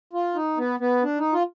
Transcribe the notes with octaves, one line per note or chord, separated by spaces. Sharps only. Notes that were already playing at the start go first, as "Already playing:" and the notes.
F4
D#4
B3
B3
D4
D#4
F4